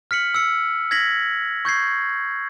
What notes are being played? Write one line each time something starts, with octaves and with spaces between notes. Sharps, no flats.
F6 B6 C#7 F#7
E6 C#7
G#6 A#6 B6 F#7
C#6 G6 G#6 C7